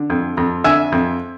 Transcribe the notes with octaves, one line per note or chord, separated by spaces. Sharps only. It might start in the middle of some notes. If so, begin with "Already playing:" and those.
Already playing: D3
F2
F2
D3 E5 G#5
F2